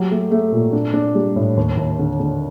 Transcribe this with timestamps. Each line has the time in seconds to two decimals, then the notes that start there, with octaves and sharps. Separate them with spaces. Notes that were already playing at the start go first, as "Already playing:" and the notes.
Already playing: F#3 G4
0.11 A3
0.31 A3
0.52 A#2
0.73 D4
0.94 D4
1.15 G3
1.36 A2
1.57 D#2
1.77 D#2
1.99 D3
2.20 D3